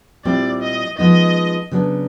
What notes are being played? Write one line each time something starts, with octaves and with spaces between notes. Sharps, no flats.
A#2 G3 C4 E4 D5
D#5
F3 G#3 B3 D#4 D#5
C#3 F#3 B3 D4